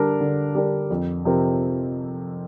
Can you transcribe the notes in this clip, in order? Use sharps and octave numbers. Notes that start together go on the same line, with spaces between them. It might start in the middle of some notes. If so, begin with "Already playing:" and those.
Already playing: D3 G3 D4 A#4
D3
G3 D4 A#4
F2
C3 F3 C4 A#4